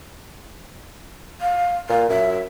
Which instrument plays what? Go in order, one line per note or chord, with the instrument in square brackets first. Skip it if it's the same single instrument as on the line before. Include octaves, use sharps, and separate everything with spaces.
[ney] F5
[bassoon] A#2 [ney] F5
[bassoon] F#2 [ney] E5